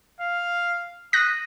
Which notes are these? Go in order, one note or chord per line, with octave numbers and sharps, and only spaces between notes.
F5
D#6 F#6 A#6